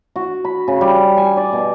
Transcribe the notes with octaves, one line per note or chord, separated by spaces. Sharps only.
F#4
B5
C#3
G3
G#5
D5
B2